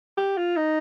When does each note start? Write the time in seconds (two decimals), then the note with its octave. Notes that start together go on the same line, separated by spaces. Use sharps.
0.18 G4
0.37 F4
0.57 D#4